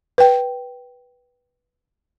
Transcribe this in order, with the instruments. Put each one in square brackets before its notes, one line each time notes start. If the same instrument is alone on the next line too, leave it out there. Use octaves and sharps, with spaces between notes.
[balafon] B4 G5